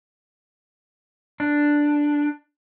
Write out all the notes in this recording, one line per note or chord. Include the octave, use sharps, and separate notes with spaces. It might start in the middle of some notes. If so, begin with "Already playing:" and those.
D4